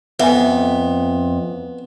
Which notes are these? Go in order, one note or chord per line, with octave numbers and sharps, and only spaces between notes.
F2 B3 E5 G#5